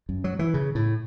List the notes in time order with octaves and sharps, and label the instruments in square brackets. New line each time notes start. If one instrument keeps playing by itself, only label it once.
[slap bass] F#2
F#3
E3
C#3
A2